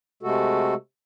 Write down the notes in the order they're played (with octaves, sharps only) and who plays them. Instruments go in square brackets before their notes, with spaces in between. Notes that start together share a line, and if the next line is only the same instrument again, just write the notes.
[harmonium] C3 G#3 A3 F#4 A4